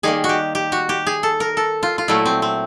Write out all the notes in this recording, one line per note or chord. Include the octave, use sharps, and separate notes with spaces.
D#3 G3 A#3 G#4
F#4
G4
G4
F#4
G4
G#4
A4
A#4
A4
F4
F4
A#2 F#3 A3 E4
C4
C4